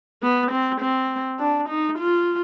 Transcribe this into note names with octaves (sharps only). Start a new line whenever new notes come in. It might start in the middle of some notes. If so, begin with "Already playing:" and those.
B3
C4
C4
D4
D#4
F4